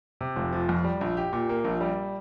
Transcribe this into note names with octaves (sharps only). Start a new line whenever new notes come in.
C3
F1
F3
F2
G3
A#1
G4
A#2
A#3
A#1
G3